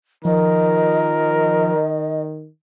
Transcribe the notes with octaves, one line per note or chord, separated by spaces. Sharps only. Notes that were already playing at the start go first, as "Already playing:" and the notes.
D#3 F3 A#4 D#5